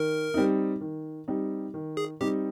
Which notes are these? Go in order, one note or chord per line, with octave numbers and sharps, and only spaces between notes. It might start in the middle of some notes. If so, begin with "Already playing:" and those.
Already playing: D#3 A#4
G3 C4 D#4
D#3
G3 C4 D#4
D#3
G#4
G3 C4 D#4 G4